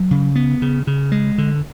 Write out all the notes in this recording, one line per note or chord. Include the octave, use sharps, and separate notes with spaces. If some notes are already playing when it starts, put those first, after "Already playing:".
Already playing: F#3
C#3
B3
C#3
C#3
G#3
D3